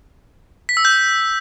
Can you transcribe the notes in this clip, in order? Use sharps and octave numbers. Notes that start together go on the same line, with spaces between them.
B6
E6
G6